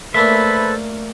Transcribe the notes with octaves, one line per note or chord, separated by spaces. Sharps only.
A3 A#3 D4 A4 B4 C5 E5 B5